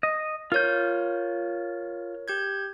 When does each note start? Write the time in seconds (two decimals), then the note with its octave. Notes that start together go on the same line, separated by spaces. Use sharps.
0.03 D#5
0.52 F4 A#4 C#5 G6
2.28 G4 G6 G#6